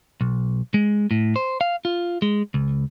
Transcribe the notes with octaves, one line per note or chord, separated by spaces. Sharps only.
B1
G#3
A2
C5
F5
F4
G#3
C#2